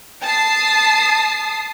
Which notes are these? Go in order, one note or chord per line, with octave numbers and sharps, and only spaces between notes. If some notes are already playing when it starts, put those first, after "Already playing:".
A5 D#6 C7